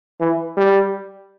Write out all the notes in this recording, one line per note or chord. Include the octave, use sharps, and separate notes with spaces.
E3
G3